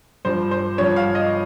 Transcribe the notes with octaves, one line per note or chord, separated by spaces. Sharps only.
G2 F3 C5
C5
G2 F3 C#5
F5
D#5